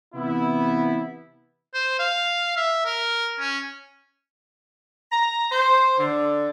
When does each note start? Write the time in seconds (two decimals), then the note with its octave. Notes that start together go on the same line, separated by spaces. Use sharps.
0.15 C3 E3 B3 E4
1.74 C5
1.99 F5
2.56 E5
2.85 A#4
3.40 C#4
5.11 A#5
5.52 C5
5.99 D3